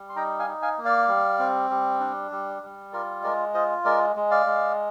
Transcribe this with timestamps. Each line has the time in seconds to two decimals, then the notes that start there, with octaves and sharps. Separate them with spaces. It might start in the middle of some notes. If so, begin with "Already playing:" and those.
Already playing: G3
0.09 C6
0.16 D#4 G5 A#5
0.39 F5 G#5
0.47 D#4
0.62 F5 G#5
0.78 A#3
0.85 D5 F5
1.08 G3
1.39 C4
1.70 G3
2.00 D4
2.31 G3
2.62 G3
2.93 F4 A#4 D5
3.23 G#3 A#4 D5
3.54 F4 C5 D#5
3.85 G#3 A#4 D5
4.16 G#3
4.31 D5 F5
4.46 G#3